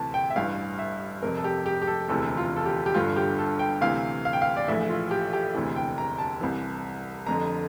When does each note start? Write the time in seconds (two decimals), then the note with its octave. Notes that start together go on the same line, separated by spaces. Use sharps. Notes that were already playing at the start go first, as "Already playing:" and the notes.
Already playing: D2 C3 E3 A5
0.14 G5
0.30 E5
0.36 A1 G2 E3 F5
0.79 E5
1.22 F1 F2 C3 A#4
1.37 A4
1.44 G4
1.66 G4
1.82 G4
1.87 A4
2.08 E1 D2 C3 E3 A4
2.37 F4
2.56 A4
2.66 G4
2.86 G4
2.94 G1 G2 D3 F4
3.16 G4
3.38 A4
3.59 G5
3.81 D2 C3 E3 F5
4.25 F5
4.33 G5
4.42 F5
4.57 D5
4.68 A#1 A2 E3 E5
4.90 F4
5.11 G4
5.33 G4
5.54 E1 D2 C3 E3
5.76 G5
5.98 A#5
6.18 A5
6.41 C2 C3 E3
7.27 F1 F2 D3 A#5